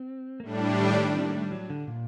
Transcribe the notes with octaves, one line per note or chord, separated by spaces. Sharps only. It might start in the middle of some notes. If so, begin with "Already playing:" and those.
Already playing: C4
A#3
A2 G3 A3 D4
F#3
D#3
C4
A#3
A3
G3
F#3
D3
A#2